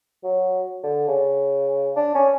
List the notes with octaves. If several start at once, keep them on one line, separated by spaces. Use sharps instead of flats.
F#3
D3
C#3
D4
C#4